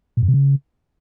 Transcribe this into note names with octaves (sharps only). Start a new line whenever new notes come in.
A#2
F#2
C3
C#3